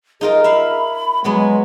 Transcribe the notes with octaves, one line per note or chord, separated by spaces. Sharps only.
D#4 F4 G#4 A#4
E5 F5 B5
F#3 G#3 B3 F#4